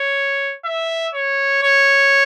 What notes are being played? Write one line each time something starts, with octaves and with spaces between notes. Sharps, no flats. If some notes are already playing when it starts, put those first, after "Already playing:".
Already playing: C#5
E5
C#5
C#5